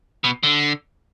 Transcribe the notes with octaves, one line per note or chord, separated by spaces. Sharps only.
B2
D3